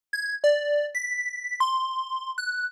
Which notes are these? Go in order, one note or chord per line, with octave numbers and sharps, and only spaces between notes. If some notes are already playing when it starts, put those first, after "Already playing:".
G#6
D5
B6
C6
F#6